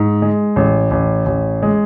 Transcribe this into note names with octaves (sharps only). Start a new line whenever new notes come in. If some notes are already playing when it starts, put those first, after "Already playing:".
Already playing: G#2
G#3
A1
A1
A1
G#3